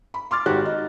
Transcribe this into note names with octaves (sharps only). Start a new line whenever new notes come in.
B5
C6 D6 F6 A6
G#1 F#4 G4 F#6
D#4